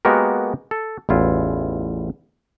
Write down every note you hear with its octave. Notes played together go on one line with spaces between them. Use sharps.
G#3 A#3 B3 F#4 G4 A#4
A4
A1 E2 E4 F4